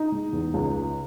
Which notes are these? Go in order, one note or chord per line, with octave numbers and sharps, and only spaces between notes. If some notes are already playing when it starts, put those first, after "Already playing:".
Already playing: D#4
G#3
E2
C#2
C#3